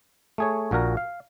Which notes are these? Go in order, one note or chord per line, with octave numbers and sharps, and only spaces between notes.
A3 G#4 C#5
A#1 A#2 F#4 A#4 A#5
F5